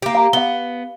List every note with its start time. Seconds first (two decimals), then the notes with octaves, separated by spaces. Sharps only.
0.02 A#3 G4
0.15 F5 A#5
0.33 B3 F5 G7